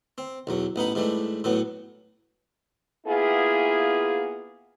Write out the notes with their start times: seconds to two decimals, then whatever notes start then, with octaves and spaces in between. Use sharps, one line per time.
0.18 C4
0.47 B1 E2 F#3
0.76 A1 B3 D#4 B5
0.95 G#2 E3 G3 A3
1.44 A2 E3 F#3 B3
3.07 A#3 B3 E4 F4 G#4